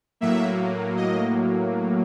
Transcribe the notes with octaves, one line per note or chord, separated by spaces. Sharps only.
A2 F#3 A#3 E5
D#5